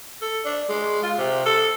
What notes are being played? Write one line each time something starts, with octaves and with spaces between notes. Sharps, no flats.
A4
D4
G#3
F4
C3
A4